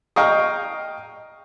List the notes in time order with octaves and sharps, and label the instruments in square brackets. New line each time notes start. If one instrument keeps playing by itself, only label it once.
[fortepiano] D#5 F5 G5 A#5 C#6 D#6